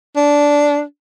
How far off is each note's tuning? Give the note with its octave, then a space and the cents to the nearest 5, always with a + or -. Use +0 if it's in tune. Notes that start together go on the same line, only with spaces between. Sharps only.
D4 -10